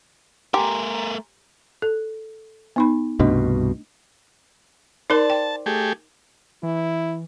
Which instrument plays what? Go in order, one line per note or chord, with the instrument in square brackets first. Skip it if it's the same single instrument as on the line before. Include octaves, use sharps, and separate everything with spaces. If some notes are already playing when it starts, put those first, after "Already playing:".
[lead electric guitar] A3 A#4 [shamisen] G4 [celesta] G#5 A#5 C6
[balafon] A4
B3 D#4 B5
[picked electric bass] C2 G2 B2 [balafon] A3 D4 D#5
[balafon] D#4 A#4 [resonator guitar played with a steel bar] C5 D5 [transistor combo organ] A5
[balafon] G5
[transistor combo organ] A3 G4 G#4
[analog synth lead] E3 [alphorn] E4